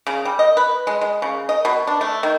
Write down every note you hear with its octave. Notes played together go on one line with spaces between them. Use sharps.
C#3
G3
D#5
B4
G#3
G#3
C#3
D#5
B2
D4
A3
D#3